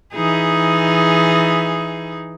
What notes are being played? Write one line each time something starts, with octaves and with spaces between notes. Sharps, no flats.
E3 D#4 G#4